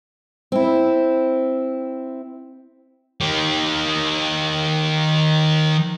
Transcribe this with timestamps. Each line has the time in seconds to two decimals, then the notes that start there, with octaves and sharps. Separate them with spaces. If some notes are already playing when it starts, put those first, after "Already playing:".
0.52 C4 E4
3.21 D#3 G4